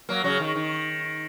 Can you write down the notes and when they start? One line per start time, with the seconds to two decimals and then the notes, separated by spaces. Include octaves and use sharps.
0.09 F#3 A#3
0.24 C#3 F#3
0.40 D#3
0.56 D#3